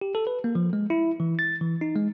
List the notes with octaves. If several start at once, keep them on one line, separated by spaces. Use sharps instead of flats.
G4
A4
B4
A#3
F3
G#3
E4
E3
A6
E3
D#4
G#3